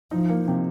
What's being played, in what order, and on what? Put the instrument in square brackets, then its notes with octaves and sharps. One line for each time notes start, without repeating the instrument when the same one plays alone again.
[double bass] F3 [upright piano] D#4
[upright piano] A#3
C3